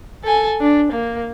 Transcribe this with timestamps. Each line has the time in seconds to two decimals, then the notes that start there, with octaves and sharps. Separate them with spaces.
0.24 A4 G#5
0.61 D4
0.92 A#3